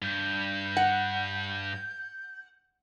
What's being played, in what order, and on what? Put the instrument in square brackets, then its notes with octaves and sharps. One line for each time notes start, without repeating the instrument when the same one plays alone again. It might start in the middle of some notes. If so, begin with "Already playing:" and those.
[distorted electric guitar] G2 [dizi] G6
[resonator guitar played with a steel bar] F#5